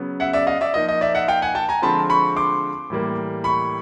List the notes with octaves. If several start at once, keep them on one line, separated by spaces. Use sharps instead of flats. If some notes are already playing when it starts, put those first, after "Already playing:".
Already playing: C#3 F#3 B3
E5 F#5
D5 E5
D#5 F5
D5 E5
F3 A#3 D#4 D#5
D#5
D5 E5
E5 F#5
F5 G5
F#5 G#5
G5 A5
G#5 A#5
D3 F3 G#3 C4 F4 A5 B5
B5 C#6
C6 D6
A2 E3 G3 A#3
B5 C#6